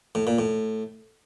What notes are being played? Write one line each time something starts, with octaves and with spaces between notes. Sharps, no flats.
A2
A#2
A2